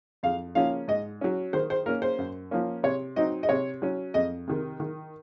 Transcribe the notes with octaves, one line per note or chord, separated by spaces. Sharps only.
F2 F5
C#3 F3 A#3 C#4 F5
G#2 D#5
F#3 C#4
D#3 C5
C5
A#3 C#4 A#4
C5
F#2
F3 A#3 C#4
C3 C#5
F#3 C4 D#4 D#5
D#5
C3 C#5
F#3 C#4
F2 D#5
C3 D#3
D#3